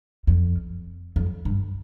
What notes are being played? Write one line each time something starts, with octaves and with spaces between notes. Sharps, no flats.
F2
F2
G2